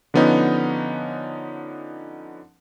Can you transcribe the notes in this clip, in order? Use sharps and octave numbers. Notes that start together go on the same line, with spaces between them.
D3 F3 B3 C#4 D#4